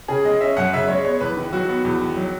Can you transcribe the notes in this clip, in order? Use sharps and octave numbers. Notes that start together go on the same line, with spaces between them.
C#3 G#4
G#3 D#5
C#4 E5
F#2 F#5
C#3 E5
G#3 C#5
B3 C#5
E2 B4
D#3
F#3 F#4
B3 F#4
E2
D#3
F#3